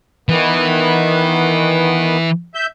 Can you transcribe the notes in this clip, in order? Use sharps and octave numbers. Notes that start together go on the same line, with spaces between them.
D#3 E3 B3
E5 G6